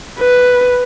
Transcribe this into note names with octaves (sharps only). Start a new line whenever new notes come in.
B4